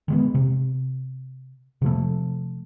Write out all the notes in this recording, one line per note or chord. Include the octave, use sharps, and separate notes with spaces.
D#3 G#3 B3
C3
C3 F3 A3